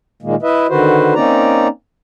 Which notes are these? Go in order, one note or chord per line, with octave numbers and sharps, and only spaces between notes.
A#2 D#3 G#3 A#3
E4 B4 D#5 E5
D3 D#3 F#4 B4 C5
A#3 C4 C#4 D#4 D5 A#5